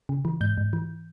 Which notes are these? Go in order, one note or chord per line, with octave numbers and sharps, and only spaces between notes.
C#3
E3
G#2 G6
G#2
E3